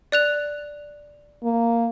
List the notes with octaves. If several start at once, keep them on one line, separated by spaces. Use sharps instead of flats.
D5 F#6 F7
A#3